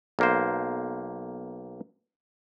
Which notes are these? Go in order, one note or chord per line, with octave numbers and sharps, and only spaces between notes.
B1 A#3 C5